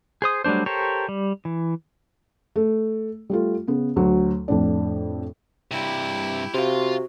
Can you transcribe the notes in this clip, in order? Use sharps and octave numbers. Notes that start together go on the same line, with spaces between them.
G#4 C5 D#6
F#3 G3 A3 D4 C5
G4 A4 A#4 C5 C#5
G3
E3
A3
G3 A3 F4
C#3 B3
D2 F#3
F2 A2 D4
G2 C3 E4 G4
C3 F4 F#4 F5